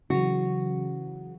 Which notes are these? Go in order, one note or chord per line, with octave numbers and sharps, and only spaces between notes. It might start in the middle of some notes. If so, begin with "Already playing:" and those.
C#3 E3 F#3 F#4